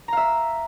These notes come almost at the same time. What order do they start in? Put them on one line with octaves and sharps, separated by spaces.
A#5 F5 E5